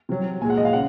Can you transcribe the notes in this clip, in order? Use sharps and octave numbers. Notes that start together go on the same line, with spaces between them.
C3 F#3
A#2 G#3 G#5
F#5
D#5
F5
C#3 F#5